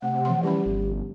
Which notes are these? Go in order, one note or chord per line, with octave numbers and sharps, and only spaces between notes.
C3 A3 F#5
E3 F3 C6
E3 G3 C#4 G4 B5
G1